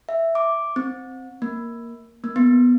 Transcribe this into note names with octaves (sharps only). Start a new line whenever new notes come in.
E5
D6
C4
A#3
A#3
B3